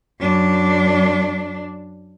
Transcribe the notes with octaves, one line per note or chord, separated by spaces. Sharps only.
F#2 D4